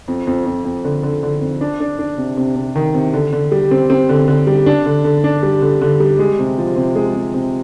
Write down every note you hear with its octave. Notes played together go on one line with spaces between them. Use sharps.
F2
F2
F2
F2
D3
D3
D3
F2
D4
D4
D4
C3
C3
C3
D#3
C3
D3
D3
G3
C4
C4
D3
D3
G3
D4
D3
D3
D4
G3
D3
D3
G3
G#3
C3
F3
C3
G#3
C3
C3